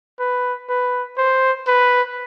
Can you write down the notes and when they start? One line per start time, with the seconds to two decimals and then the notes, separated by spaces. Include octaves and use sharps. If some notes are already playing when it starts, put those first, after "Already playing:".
0.19 B4
0.69 B4
1.18 C5
1.68 B4